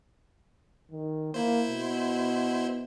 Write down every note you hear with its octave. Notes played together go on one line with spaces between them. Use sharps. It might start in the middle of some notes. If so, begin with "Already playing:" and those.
D#3
A#3 E4 C5
B2